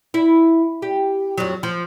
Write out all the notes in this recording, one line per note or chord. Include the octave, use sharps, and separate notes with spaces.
E4
G4
F2 F#3
F3